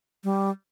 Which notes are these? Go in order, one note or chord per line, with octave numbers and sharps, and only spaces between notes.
G3